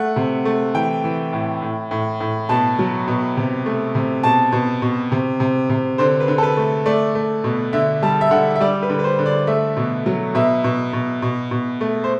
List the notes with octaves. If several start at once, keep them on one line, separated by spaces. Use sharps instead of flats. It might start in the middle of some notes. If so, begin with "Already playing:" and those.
Already playing: A3 F#5
C3
A3
E3 G5
E3
A2
A2
A2
A2
B2 A5
F#3
B2
C3
A3
C3
B2 A5
B2
B2
C3
C3
C3
D3 C5
B4
D3
A4
B4
A3
A3 D5
A3
B2
D3 E5
G3 A5
E5
D3 F#5
E5
G3 D5
B4
D3
B4
C5
D3
D5
A3 E5
B2
F#3
B2 E5
B2
B2
B2
B2
A3
C5